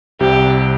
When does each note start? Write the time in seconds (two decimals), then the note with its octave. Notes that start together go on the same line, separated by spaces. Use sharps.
0.20 C2 C3 G3 G4